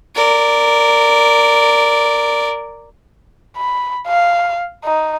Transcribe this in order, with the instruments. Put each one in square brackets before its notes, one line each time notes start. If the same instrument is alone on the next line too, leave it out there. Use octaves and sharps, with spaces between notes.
[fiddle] A#4 D5
[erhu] B5
F5
D#4